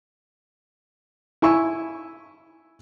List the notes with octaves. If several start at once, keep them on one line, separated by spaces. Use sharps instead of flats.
E4 G#5 C#6 E6